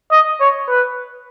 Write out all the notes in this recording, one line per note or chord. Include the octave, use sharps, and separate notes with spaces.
D#5
C#5
B4